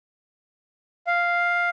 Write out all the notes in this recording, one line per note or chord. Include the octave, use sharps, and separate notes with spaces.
F5